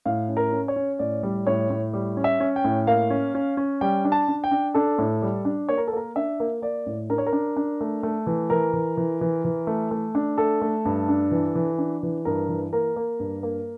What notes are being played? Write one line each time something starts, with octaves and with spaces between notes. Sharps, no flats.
A2 F5
C#4
A#4
C#4
C#5
C#4
A2 D5
G3
A2 C#5
A2
G3
C#4
E5
C#4
G5
A2
A#3 F5
C#4
C#4
C#4
G3 G5
D4
A5
D4
G5
D4
D4 A4
A2
G3
D4
A#3 C#5
A#4
A4
A#3 A#4
D4 E5
A#3
A#3 D5
A2
D4 A#4
C#5
A#4
D4
D4
A3
A3
E3
E3 A#4
E3
E3
E3
E3
A3
A3
D4
A3 A4
A3
G2
D4
E3
E3
D4
E3
G2 A#4
E3
A#3 A#4
A#3
G2
A#3